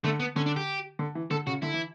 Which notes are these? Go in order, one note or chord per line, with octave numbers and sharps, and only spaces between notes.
D3 A3
B3
D3 C#4
D4
G4
D3
E3
D3 A4
C#3 F#4
D3 E4
E3